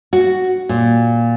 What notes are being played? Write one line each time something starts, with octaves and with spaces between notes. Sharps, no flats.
F#4
A#2